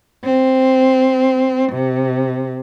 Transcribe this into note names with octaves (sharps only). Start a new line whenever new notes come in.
C4
C3